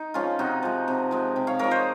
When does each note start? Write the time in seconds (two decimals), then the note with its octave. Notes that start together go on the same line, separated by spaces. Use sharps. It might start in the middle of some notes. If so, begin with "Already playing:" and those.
Already playing: D#4
0.14 F3 G#3 C#4 F4
0.39 C3 D#4 F#4
0.62 F3 G#3
0.88 C3
1.11 F3 G#3
1.36 C3
1.47 C#5 F5
1.59 F3 G#3 A#4 C#5
1.71 C5 D#5